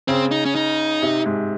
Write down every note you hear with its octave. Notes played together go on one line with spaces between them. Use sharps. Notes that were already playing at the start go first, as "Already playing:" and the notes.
C#3 C4
D#4
C#4
D#4
C3
G#2